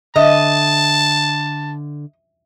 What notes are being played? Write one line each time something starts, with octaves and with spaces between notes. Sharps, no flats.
D3 D#5 E5 A5